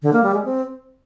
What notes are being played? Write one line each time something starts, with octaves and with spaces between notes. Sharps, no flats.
D3
A#3
G3
G#3
C4